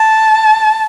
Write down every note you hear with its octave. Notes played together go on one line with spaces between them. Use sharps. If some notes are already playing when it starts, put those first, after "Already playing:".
Already playing: A5